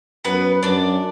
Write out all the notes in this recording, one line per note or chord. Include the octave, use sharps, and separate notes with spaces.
F#2 B3 B4
F#2 D4 D5